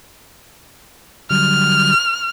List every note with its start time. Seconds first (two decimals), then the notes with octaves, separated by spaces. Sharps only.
1.30 D3 F#3 G3 F6